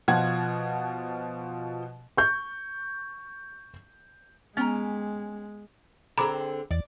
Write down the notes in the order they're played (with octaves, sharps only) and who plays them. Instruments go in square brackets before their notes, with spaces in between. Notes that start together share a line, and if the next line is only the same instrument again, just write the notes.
[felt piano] B2 F3 F4 F#5 G#6
C#6 G6
[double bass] G#3 [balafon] B3 [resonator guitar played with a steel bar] C#4 G5 A#5
[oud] D3 C4 G#4 [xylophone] A#5 B5 D6
[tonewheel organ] E2 [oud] D5